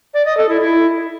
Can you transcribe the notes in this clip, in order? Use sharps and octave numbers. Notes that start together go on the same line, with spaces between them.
D5
D#5
A4
E4
E4